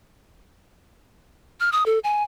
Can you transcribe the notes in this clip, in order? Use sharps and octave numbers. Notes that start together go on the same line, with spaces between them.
F6
D#6
A4
G#5